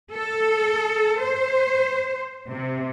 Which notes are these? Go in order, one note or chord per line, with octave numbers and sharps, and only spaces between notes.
A4
C5
C3